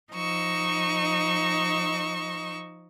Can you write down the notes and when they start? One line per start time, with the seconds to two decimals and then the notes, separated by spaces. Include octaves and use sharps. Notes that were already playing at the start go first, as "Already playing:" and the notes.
0.12 F3 D#4 D#5 C#6 E6